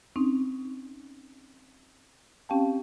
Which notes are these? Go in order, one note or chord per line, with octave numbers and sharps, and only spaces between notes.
C4 C#4 D#4
C4 C#4 G4 F5 G5 A5